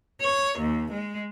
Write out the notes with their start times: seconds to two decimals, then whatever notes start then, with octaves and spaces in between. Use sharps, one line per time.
0.21 C#5
0.59 D#2
0.92 G#3